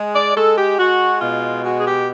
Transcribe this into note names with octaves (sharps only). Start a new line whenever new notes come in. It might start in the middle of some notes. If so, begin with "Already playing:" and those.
Already playing: G#3
D5
G#3 A4
G4
G#3 F#4
B2 F4
G#3 F#4
G#4
G4